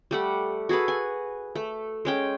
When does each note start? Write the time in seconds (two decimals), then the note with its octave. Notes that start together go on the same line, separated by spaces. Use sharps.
0.11 G3 A3 F#5
0.69 F#4 G#4 A4 B4
0.88 G#5
1.55 A3
2.05 G#3 C#4 G5